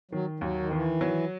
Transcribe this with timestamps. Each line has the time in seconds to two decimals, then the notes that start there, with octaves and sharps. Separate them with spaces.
0.11 D#3 F#3
0.40 D#2 F#3
0.60 D#3
0.71 D#3 E3
1.01 F#3